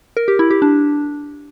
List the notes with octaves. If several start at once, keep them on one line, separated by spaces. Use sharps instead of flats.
A#4
G4
E4
G4
D4